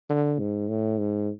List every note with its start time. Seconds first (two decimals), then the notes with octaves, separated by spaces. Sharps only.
0.09 D3
0.40 G#2
0.69 A2
0.99 G#2